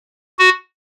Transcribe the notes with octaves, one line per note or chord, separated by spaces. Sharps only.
F#4